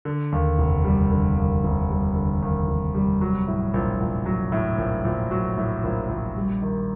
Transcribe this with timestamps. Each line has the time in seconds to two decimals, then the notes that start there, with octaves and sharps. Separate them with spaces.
0.05 D3
0.32 D#2
0.58 F1
0.84 G3
1.11 D3
1.37 D#2
1.64 F1
1.90 G3
2.15 D3
2.42 D#2
2.68 F1
2.94 G3
3.21 F#3
3.48 A2
3.74 A#1
4.00 A#1
4.26 F#3
4.52 A2
4.78 A#1
5.05 A#1
5.31 F#3
5.58 A2
5.84 A#1
6.09 A#1
6.36 G3
6.62 D#3